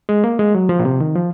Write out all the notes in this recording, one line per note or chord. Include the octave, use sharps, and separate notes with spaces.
G#3
A#3
G#3
F#3
F3
A#2
C3
D#3
F3